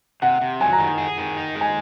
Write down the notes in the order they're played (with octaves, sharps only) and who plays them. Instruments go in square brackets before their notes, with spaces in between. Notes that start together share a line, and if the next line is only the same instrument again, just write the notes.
[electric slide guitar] C3 [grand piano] F#5
[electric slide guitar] C3
[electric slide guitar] F#3 [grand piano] G#5
[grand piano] A#5
[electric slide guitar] D#3
G#4
D#3
D#4
G#3
[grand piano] G#5